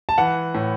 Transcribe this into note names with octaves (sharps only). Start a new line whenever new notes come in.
A5
E3 F#5
A2